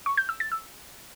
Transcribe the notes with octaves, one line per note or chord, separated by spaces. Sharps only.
C#6
G6
E6
A6
E6